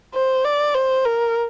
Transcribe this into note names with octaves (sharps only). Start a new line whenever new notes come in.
C5
D5
C5
A#4